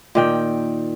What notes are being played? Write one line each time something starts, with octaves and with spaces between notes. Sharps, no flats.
A#2 D#3 G5